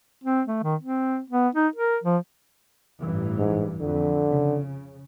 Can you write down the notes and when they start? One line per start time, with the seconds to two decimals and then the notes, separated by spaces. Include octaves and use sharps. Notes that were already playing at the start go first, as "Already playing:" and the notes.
0.24 C4
0.47 A3
0.63 D#3
0.81 C4
1.30 B3
1.55 D#4
1.76 A#4
2.04 F3
2.99 A1 G2 E3
3.37 G#2
3.80 F2 D3
4.28 C#3